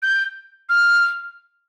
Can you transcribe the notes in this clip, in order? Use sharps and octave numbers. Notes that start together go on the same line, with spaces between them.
G6
F6